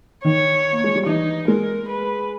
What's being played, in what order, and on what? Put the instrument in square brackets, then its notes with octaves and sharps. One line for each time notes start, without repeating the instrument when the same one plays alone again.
[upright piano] D#3 [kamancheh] C#5
[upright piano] A#3
G#3
G3
[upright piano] E3 [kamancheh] D#4
[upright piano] G#3 [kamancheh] A#4
[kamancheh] B4